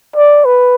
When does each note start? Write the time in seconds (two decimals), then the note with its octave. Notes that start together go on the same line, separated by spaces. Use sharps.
0.16 D5
0.45 B4